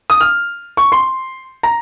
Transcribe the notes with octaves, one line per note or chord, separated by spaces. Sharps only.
D#6
F6
C#6
C6
A#5